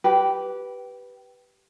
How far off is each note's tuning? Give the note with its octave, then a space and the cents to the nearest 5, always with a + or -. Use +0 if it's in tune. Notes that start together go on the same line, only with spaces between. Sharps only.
G4 -15 B4 -5